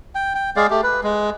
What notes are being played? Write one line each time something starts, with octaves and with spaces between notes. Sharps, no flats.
G5
G5
G#3 G#4 D5 F5
A3 G4
B4
G#3